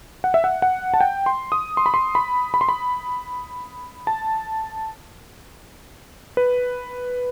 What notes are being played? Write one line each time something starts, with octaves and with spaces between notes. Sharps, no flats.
F#5
E5
F#5
F#5
A5
G5
C6
D#6
C6
B5
C6
B5
B5
C6
B5
A5
B4